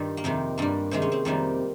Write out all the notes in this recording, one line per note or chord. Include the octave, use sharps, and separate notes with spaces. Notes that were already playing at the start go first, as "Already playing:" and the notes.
Already playing: G2 D#3 G3 F4
A#3
F2 C3 D#3 C4
G2 G3 A#3
C3 D#3 G#3 C4
C#4
C4
F2 C3 D#3 G3 A#3